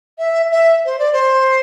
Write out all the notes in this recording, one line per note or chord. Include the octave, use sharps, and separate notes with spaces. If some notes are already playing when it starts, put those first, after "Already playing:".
E5
E5
C5
D5
C5